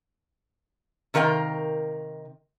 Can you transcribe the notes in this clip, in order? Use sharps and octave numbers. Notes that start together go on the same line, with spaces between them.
C3 D#3 A#4 F5 G5